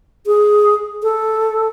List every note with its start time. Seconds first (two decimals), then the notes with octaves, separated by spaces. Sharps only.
0.27 G#4
1.03 A4